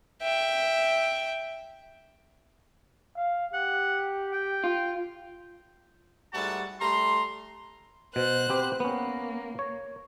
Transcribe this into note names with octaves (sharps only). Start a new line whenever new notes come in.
E5 G5
F5
G4 F#5
G5
F4
G#2 G3 A3 F#4 A5
G3 A3 A#5 C6
B2 C5 F#6
B3 C4 G4
A#3 B3 C#4
C#5